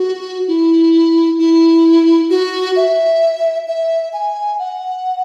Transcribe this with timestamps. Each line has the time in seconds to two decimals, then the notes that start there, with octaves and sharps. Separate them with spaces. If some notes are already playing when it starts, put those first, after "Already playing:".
Already playing: F#4
0.48 E4
1.39 E4
2.30 F#4
2.76 E5
3.67 E5
4.13 G#5
4.59 F#5